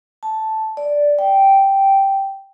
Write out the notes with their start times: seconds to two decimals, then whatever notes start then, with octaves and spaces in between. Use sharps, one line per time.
0.23 A5
0.77 D5
1.19 G5